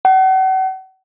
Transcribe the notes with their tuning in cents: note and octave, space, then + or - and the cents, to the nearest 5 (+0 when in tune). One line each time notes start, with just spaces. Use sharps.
F#5 +40